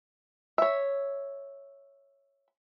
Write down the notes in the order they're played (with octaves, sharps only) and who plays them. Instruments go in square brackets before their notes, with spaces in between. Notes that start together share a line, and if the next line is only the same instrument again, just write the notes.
[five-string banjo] C#5 E5